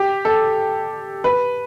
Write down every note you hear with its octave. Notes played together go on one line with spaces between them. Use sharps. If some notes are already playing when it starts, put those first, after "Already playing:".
Already playing: G4
A4
B4